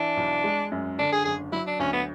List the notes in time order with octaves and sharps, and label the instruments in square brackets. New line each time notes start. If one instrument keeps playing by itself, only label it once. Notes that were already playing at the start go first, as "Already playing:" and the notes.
Already playing: [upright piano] E3 [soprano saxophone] D4
[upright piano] B1
G#3
F#2
[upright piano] D3 [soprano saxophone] D4
[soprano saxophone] G#4
[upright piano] F#1 [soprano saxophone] G#4
[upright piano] F#3 [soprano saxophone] E4
[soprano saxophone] D4
[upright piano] D2 [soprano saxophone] C#4
[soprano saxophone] B3